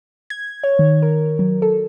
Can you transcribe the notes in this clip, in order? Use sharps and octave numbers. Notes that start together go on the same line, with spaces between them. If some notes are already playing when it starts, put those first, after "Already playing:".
G#6
C#5
D#3
A#4
F#3
A4